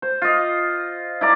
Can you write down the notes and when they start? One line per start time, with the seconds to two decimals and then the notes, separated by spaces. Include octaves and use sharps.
0.02 C5
0.22 F4 D#5
1.21 E4 D5 A#5